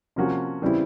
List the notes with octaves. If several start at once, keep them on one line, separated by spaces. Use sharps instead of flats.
C3 F3 A#3 C#4 F#4
C#3 E3 G3 C4 E4